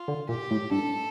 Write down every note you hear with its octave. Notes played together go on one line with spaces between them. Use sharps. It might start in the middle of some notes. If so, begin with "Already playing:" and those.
Already playing: F4
D3
A#2 G4
A2
G2 A4